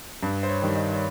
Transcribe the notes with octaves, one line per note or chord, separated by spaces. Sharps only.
G2
C5
C#5
D#3 G3
D#5
C#5